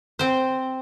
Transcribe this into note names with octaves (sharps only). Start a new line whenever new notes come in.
C4 C5